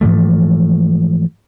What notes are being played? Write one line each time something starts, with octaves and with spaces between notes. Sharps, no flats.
G#2 E3 F3 A3